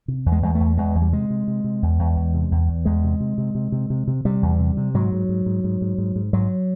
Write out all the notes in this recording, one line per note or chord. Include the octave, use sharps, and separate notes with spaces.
C3
E2
G#3
E2 G#3
A3
E2
E2 G#3
E2
G3
C3 G#3
C3
C3
C3
E2
E2
E2
C3
E2
E2
E2 G#3
C3
C3
C3
C3
C3
C3
C3
C3 G3
E2
C3
C3
G#2 F#3
G#2
G#2
G#2
G#2
G#2
G#2
G#2
G#2 F#3